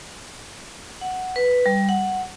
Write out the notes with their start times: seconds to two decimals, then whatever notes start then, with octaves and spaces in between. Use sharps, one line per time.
1.01 F#5
1.36 B4
1.66 G3
1.89 F#5